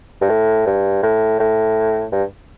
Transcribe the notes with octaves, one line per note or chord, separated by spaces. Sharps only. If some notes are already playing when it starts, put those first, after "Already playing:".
G2
A2
G2
A2
A2
G2